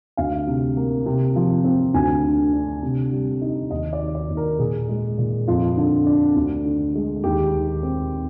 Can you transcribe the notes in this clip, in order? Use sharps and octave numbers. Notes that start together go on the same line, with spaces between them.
D2 F5
C3
A#3
C3
F3
C4
D2 G#5
D3
D4
C3
G3
D#4
D#2 D#5
D5
D#3
D5
D#2
A#4
A#2 G#4
G#3
A#2
F2 F4
D3
D4
D2
D3
G#3
D#2 G4
D#3
C4